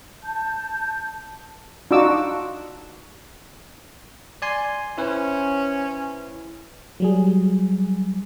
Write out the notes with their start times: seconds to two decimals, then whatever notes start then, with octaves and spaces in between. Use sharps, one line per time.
0.23 A5 G6
1.91 D4 D#4 F4 F#4 D6 E6
4.42 D5 G#5 C6
4.98 C#4 E4 B4 C5
7.00 F#3 G3 G#4